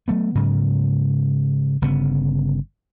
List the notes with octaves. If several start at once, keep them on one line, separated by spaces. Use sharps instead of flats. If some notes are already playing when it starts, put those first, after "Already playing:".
F#3 A3 B3
G#2 C#3 F#3
G1 C#3 B3